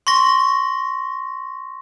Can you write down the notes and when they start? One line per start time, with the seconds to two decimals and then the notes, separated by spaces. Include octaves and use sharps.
0.07 C6 C#6 A#6